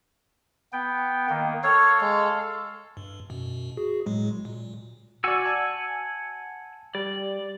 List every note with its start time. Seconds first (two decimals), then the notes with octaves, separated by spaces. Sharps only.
0.73 B3 G5
1.30 D#3 A#3
1.64 A4 C#5 F5
2.01 G#3
2.97 G2
3.30 F#2 B2
3.77 F#4 G#4
4.06 A2 F#3 G#3
4.45 A#2
5.24 F#4 D5 F#5 G#5 E6
5.46 A5
6.95 G3 D5